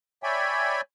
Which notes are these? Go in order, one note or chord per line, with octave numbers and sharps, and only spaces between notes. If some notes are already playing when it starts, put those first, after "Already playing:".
C#5 D5 E5 G5 G#5 B5